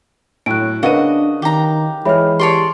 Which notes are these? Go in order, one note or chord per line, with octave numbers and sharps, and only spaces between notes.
A2 F#3 F#6 D7
C#3 D4 F#4 A#4 B4 D#5 F5 D#7
D#3 G4 A#5
E3 G#3 C#5 E5 B5 F6
G4 C#5 D5 A5 C6